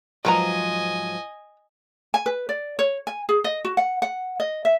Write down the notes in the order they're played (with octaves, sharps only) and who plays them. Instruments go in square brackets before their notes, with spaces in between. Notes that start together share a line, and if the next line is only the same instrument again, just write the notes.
[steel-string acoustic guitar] G#2 F3 F#3 [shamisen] A#4 B4 A#5 [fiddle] D#5 G#5
[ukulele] G#5
B4
D5
C#5
G#5
G#4
D#5
F#4
F#5
F#5
D#5
E5